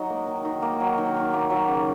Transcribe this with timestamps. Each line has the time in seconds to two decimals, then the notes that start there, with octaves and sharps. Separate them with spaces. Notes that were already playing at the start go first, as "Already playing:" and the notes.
Already playing: F#3 D#4
0.10 A#3
0.27 D#3
0.45 D#3
0.62 A#3
0.80 F#3
0.98 D#3
1.14 D#3
1.33 A#3
1.50 F#3
1.68 C#3